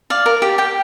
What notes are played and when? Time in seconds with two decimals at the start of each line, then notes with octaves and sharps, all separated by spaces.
0.10 D5 F5
0.26 A#4
0.42 G4
0.58 G4 G5